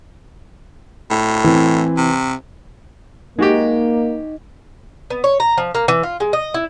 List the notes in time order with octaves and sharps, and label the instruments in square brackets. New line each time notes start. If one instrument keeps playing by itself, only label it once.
[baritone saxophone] A2
[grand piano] E3 C4
[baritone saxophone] C3
[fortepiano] G#3 F#4 G4 [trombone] A#3 [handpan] D#4
[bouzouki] B3
C#5
A#5
F3
A#3
E3
F4
G#3
D#5
E4